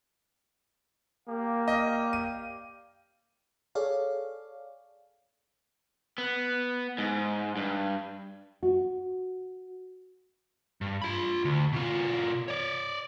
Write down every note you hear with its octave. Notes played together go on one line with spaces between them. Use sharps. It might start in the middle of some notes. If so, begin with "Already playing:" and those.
A#3 G4 D5 F5
D#5
D#7
G#4 A4 C#5 D5 F5
B3
G#2
G2
F#4
G2
F4 B5
D2
B2 F4
C#5 D5